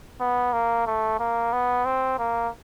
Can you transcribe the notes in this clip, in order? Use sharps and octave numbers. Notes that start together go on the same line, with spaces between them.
B3
A#3
A3
A#3
B3
C4
A#3